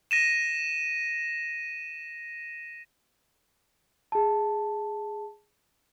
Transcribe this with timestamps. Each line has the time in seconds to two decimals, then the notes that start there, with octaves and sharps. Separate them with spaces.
0.11 A#6 D#7 E7
4.12 G#4 A5